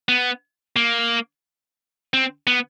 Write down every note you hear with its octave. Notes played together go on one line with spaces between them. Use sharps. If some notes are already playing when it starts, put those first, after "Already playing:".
B3
A#3
C4
B3